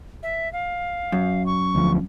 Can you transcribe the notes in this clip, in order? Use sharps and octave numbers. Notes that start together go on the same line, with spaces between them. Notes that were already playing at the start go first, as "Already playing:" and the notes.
E5
F5
F#2
C#6
D2 F3